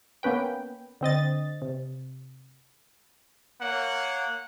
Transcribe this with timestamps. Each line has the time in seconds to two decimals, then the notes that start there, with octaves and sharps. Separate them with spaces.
0.23 A#3 B3 C#4 B4 G5
1.01 D3 C4 D#5 A6
1.62 C3
3.60 A#3 C#5 F#5